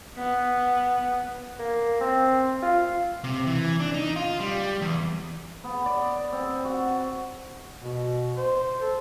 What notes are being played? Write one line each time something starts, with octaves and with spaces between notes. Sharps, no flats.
B3
A#3
C4
F4
C3
E3
D4
D#4
F4
G3
E2
B3
D5
C4
F#4
B2
C5
A4